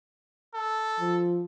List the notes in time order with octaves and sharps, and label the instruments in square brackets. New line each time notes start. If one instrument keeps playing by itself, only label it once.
[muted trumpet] A4
[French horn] F3